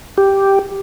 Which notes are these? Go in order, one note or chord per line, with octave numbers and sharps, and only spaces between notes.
G4